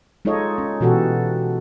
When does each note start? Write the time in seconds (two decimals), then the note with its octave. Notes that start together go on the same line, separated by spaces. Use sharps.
0.25 G#3 D#4 F4 A4 C#5 D#5
0.58 C#4
0.81 B2 E3 F#4 G4 A4